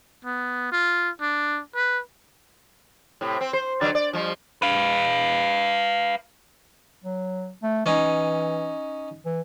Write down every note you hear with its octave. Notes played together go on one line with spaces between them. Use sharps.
B3
F4
D4
B4
A2 C3
C4
C5
D3 F#3 D5
D5
F3 G3
B4 F5
F#3
A3
E3 C#4 D#4
E3